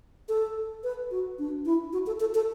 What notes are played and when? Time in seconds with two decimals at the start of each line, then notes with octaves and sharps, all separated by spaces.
0.29 A4
0.84 B4
1.11 F#4
1.38 D4
1.65 E4
1.93 F#4
2.07 A4
2.20 A4
2.34 A4